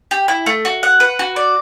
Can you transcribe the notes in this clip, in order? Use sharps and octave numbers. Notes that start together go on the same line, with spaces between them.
G4
E4
A3
F#4
F#5
B4
F#4
D5